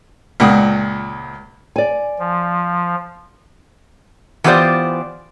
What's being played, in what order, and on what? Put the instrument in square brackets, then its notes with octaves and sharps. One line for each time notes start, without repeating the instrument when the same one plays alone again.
[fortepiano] C#2 A#2 F#5 G5 D#6
[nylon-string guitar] D5 G#5
[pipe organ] F3
[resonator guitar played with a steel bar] E3 B3 F4 G4 C5 D5